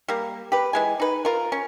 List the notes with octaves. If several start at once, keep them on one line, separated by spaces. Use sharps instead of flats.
G3 A#3
G4 B4
E3 G#3 G#5
D#4 B4
F4 A#4
C#4